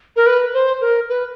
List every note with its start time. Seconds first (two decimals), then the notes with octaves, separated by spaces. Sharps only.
0.16 A#4
0.27 B4
0.54 C5
0.81 A#4
1.09 B4